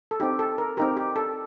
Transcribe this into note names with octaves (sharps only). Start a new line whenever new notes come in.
A4
C4 D#4 G4
A4
A#4
C4 D#4 G4 A#4
G4
A4